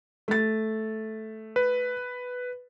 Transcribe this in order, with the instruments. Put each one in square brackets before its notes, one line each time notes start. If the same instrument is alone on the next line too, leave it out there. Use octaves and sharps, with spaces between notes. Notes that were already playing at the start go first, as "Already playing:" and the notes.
[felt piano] A3 A6
[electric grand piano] B4